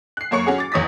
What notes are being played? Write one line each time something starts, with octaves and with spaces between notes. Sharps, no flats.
F#6 C7
F#2 A#3 C#5 C#6 C#7
C#4 F#4 G#4
D6 A6
A1 E2 C#5 D#6 A#6 B6